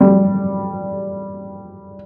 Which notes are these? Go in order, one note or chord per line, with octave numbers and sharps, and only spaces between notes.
G3